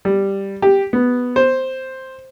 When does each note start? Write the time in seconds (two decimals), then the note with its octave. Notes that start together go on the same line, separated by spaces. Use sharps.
0.05 G3
0.62 G4
0.93 B3
1.36 C5